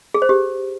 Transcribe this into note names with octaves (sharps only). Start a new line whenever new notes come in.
G#4
C5
G4